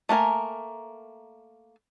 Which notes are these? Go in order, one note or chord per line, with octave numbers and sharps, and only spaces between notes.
A3 A#3 A#4 G#5